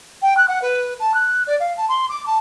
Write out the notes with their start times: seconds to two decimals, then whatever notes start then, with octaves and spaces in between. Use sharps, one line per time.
0.22 G5
0.37 F#6
0.48 F#5
0.61 B4
0.99 A5
1.14 F#6
1.46 D5
1.59 F5
1.76 A5
1.88 C6
2.09 D6
2.26 A5